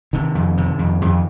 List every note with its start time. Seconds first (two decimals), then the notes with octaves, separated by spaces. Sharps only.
0.13 C3 D#3
0.35 F2
0.57 C3
0.79 F2
1.02 F2